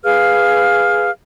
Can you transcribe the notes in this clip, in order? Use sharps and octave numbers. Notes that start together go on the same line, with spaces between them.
G#4 B4 F5 F6